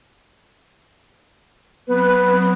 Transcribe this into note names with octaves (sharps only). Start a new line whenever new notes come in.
F#3 B3 C4 B4